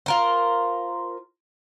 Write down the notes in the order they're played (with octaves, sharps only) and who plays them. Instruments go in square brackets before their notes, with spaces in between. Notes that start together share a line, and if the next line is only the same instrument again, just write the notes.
[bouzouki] F4 A#4 C5